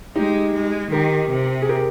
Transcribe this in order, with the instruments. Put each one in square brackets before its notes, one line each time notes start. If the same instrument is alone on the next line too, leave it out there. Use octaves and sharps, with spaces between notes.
[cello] G#3 [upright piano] D#4 G4
[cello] G#3
[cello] D#3 [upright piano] G4 A#4
[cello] C3
[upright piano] G#4
G4 A#4